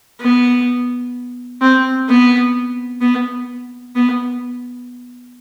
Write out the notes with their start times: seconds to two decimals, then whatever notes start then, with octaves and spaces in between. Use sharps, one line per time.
0.20 B3
1.61 C4
2.08 B3
3.01 B3
3.95 B3